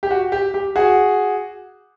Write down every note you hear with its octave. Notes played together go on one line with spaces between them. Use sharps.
G4
F#4
G4
G4
F#4 G#4